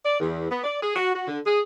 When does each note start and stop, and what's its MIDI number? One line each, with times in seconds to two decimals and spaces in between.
0.04 0.19 74
0.20 0.48 40
0.50 0.62 59
0.64 0.78 74
0.82 0.94 68
0.96 1.14 66
1.14 1.27 66
1.27 1.39 50
1.46 1.59 68